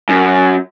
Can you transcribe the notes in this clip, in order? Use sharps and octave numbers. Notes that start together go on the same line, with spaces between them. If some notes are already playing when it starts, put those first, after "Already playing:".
F#2